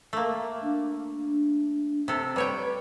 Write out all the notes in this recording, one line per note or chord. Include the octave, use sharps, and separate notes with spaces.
A3 A#3
D4
C3 A4
G3 B4 C#5 G5